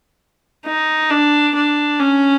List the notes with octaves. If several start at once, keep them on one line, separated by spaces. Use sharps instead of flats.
D#4
D4
D4
C#4